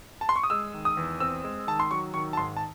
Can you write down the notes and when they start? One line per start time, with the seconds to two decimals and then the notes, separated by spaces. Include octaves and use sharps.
0.21 A5
0.29 C6
0.36 C#6
0.43 D#6
0.50 G#3 E6
0.74 D#3
0.85 D#6
0.97 E2
1.20 C4 E6
1.44 G#3
1.67 D#3 A5
1.80 C6
1.91 F#3 C#6
2.14 D#3 C#6
2.33 A5
2.37 G#2 C6
2.57 A5